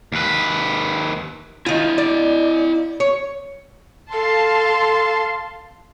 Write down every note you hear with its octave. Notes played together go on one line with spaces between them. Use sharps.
D#2 B4
D#3 E4 F4 D#5
D5
C#5
A4 F5 A5 C6